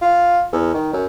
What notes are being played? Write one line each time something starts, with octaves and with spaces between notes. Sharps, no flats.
F4
E2
D#3
F#2